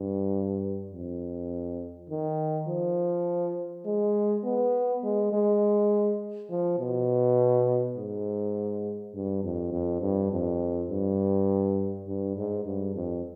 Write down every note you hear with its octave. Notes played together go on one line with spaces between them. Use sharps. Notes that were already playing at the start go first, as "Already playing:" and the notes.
Already playing: G2
F2
D#3
F3
G#3
B3
G#3
G#3
F3
B2
G#2
G2
F2
F2
G2
F2
G2
G2
G#2
G2
F2